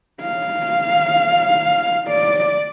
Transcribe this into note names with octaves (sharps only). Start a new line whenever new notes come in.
F5
D5